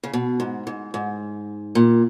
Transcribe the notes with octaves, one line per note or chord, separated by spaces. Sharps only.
C#3
B2
G#2
G#2
G#2
A#2